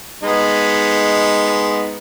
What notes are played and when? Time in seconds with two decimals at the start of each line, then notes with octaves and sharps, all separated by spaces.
0.23 G#3 B3 D#4